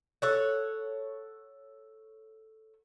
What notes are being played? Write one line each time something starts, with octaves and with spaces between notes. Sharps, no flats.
A4 C#5 F#5